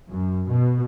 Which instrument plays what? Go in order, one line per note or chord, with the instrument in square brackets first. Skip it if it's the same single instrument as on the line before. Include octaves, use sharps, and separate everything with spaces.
[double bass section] F#2
B2